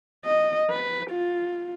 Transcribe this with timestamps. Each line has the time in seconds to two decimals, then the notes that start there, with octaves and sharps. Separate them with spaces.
0.25 D#5
0.70 B4
1.10 F4